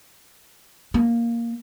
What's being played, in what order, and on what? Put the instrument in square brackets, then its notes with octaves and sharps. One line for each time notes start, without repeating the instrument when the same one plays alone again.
[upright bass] A#3